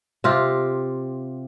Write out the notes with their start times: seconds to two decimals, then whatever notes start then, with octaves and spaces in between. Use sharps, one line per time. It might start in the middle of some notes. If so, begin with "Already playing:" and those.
0.24 C3 F4 G4